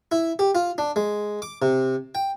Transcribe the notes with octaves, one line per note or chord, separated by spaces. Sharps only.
E4
G4
F4
D4
G#3
D6
C3
G5